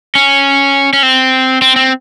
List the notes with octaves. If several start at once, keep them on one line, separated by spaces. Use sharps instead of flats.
C#4
C#4
C4
C4
C4